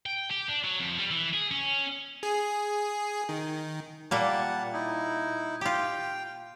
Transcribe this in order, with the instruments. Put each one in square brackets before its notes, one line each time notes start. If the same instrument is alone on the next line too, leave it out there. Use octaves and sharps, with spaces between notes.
[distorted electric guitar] G5
G4
D4
F#3
F2
G3
E3
G#4
C#4
[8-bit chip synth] G#4
D#3
[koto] A#2 G3 A#3 [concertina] F#5 A5
[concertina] D#4 E4
[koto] F4 G4 [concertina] G5